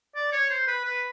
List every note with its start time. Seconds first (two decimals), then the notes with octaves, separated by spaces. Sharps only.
0.16 D5
0.33 C#5
0.50 C5
0.67 B4
0.84 B4